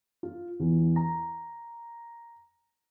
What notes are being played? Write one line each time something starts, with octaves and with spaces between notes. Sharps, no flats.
F4
E2
A#5